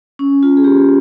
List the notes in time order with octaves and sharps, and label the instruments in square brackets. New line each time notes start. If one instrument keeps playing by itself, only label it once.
[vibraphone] C#4
F4
G#4
G4